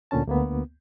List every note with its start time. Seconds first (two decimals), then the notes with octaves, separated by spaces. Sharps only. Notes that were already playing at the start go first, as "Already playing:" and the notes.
0.11 D2 A#2 D3 C#4 A5
0.27 D2 A#3 B3